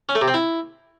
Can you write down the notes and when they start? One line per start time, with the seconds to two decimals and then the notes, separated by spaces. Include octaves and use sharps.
0.09 C#4
0.15 A3
0.21 C3
0.28 C4
0.34 E4